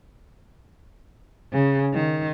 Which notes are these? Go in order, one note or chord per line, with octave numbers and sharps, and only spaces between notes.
C#3
D#3